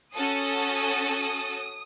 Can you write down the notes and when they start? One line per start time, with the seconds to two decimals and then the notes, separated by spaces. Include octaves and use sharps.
0.15 C#4 F#4 A4 D#6